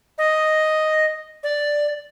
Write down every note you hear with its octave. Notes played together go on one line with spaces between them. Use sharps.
D#5
D5